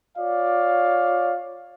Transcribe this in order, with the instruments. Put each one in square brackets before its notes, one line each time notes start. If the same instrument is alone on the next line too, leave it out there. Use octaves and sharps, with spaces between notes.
[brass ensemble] F4 C#5 D5 F5